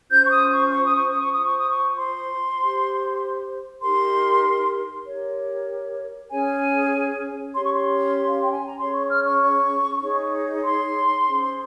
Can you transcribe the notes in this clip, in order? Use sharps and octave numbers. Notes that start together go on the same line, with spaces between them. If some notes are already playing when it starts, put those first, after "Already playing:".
C#4 F4 C5 G6
C#6
D#6
C#6
C#6
D#6
C#6
D#6
C#6
F4 C5 D#6
C#6
D#6
C#6
C6
G4 C5
D#4 G4 A#4 C6
G4 A#4 C#5
C#4 G#4 C#5 G#5
C#4 G4 C#5 C6
C#6
C6
F5
G5
G#5
A#5
C#4 G#4 C#5 C6
C#6
F6
C#6
D#4 G#4 C#5
C6
C#4 G#4 C5